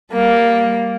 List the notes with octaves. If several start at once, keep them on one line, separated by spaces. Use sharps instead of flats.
G3 A#3